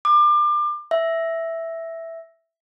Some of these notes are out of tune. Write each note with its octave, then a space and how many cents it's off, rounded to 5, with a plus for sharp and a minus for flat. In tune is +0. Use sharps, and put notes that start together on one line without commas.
D6 +30
E5 +0